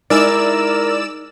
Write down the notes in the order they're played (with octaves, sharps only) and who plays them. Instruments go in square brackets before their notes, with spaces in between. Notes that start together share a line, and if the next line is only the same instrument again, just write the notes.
[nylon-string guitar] G#3 E4 G#5 [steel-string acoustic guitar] D#4 [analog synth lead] A#4 [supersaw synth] D5 E6 E7